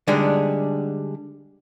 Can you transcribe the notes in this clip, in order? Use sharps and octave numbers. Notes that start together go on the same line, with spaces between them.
D3 G3 G#3 D4 D#4